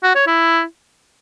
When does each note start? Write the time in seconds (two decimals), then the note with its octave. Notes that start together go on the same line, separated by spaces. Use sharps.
0.03 F#4
0.15 C#5
0.27 E4